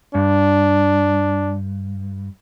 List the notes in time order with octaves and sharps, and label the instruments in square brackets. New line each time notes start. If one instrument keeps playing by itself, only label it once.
[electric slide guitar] G2 [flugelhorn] D4